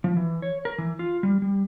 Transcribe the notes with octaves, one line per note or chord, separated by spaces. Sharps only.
F3
E3
C#5
A#4
E3
F4
G3
G3